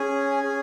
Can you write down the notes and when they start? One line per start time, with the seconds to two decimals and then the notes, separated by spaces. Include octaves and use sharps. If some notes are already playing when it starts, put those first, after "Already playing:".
Already playing: C#4 G#4 G#5
0.43 C#4 G#4